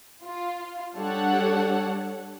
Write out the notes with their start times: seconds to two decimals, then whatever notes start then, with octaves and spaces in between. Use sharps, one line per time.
0.23 F4
0.96 G3 D4 G4 A4 C#5 F#5